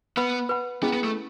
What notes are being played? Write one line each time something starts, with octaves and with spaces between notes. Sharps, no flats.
B3 B4 F#5 B5
B4 F#5 B5
B3 C#4 E4 G#4 D#5
B3
A3